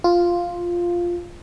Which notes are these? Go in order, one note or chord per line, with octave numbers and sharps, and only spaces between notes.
F4